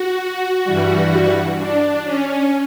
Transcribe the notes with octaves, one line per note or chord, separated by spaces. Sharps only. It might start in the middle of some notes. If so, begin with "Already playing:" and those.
Already playing: F#4
G2 E3 G3
D4
C#4